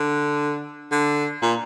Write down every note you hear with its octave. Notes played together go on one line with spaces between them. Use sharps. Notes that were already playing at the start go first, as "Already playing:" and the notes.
Already playing: D3
D3
A#2